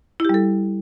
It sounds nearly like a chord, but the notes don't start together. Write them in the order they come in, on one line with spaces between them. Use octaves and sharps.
E4 G4 G3 A4